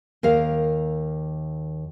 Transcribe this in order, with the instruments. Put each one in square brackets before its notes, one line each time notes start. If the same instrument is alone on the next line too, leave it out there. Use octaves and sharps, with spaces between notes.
[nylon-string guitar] D#2 A#4 F5